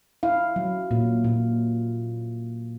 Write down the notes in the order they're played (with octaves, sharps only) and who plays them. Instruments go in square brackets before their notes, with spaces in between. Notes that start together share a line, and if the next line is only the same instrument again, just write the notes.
[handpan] E4 F5
F#3
A#2
A#2